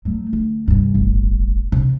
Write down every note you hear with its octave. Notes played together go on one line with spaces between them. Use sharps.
F#3 A3
D3
G2 C3
D1 G1
C3